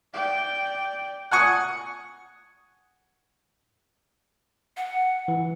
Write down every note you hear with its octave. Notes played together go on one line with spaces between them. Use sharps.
D5 G5
F#5 G#5 C#6 D#6
F#5
E3